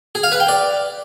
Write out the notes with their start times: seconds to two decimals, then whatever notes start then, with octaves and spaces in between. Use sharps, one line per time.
0.15 G#4
0.23 F5
0.32 B4
0.40 G5
0.49 D5